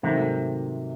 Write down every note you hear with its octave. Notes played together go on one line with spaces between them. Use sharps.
G#2 C3 D#3 F#3 A3 D#4